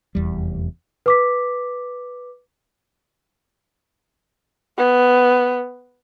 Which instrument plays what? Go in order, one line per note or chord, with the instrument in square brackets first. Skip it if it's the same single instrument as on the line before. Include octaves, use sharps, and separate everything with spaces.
[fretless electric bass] F1 E2 G3
[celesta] B4 D6 B6
[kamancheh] B3